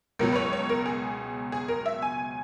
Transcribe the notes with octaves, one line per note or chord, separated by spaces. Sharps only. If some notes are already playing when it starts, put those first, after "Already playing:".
C#2 B2 F#3 A#4
B4
C#5
C#5
A#4
G#4
G#4
A#4
E5
G#5